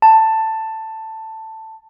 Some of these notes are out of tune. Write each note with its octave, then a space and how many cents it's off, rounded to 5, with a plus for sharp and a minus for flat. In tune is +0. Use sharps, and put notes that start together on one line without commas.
A5 +10